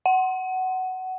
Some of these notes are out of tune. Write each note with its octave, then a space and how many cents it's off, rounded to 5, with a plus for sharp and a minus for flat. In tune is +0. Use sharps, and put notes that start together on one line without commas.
F#5 +15